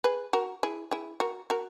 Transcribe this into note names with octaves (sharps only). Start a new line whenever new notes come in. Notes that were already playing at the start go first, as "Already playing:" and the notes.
G#4 B4
F#4 A#4
E4 G#4
E4 G#4
F#4 A#4
F#4 A#4